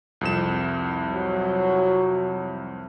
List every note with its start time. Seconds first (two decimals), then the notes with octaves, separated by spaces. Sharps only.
0.21 C2 F2 E7
1.11 F#3